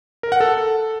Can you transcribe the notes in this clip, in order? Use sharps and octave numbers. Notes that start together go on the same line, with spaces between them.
A#4
F#5
A4